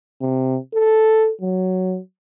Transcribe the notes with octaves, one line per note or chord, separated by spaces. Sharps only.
C3
A4
F#3